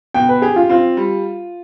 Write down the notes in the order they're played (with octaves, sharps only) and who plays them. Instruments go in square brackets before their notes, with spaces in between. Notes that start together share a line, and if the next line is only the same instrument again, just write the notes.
[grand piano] B2 [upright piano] G5
[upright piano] B4
[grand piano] G4 [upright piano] G#4
[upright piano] F4
[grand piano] C4 [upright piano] F4
[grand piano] G3